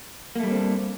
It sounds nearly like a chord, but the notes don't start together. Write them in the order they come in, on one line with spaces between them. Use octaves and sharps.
A#3 A3 G3 D4 C4